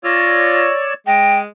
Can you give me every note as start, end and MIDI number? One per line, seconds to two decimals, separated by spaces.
0.04 0.69 65
0.04 0.94 73
0.04 0.94 74
0.04 0.94 88
0.04 0.72 94
1.07 1.46 56
1.07 1.38 79
1.07 1.34 94